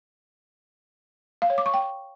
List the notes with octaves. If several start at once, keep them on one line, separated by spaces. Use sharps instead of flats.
F5
C#5
D6
C#6
G5